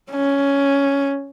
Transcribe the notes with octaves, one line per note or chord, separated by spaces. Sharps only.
C#4